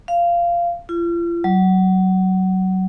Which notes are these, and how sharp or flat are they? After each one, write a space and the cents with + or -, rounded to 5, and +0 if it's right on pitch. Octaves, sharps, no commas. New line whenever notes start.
F5 -15
F4 -40
F#3 +20